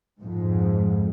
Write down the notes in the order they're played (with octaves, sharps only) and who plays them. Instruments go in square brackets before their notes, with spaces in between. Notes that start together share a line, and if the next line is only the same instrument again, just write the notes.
[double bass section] F2 G#2